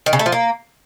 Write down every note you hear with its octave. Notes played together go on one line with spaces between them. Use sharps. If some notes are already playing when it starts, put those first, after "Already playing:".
D#3
C#3
A3
F3
A#3